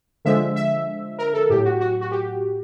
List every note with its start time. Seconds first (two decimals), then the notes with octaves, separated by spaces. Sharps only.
0.25 D3 F3 G#3 E5
0.56 E5
1.19 A#4
1.34 A4
1.50 A2 F#3 G4
1.65 F#4
1.80 F#4
2.01 F#4
2.12 G4